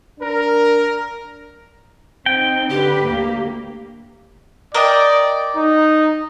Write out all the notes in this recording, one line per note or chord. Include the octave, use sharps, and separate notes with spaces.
D4 A#4
C4 D#4 G5
D3 G4 B4
D2 A#3
A#4 D5 D#5 G5
D#4